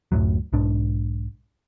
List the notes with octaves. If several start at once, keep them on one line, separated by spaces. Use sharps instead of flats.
D1 F#2 A2 F#3
B1 G#2 D4